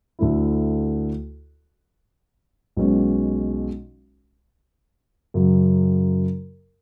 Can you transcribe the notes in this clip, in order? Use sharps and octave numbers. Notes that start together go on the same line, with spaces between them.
D2 D3 A3 E4
B1 B2 G#3 C#4
F#2 C#3 F#3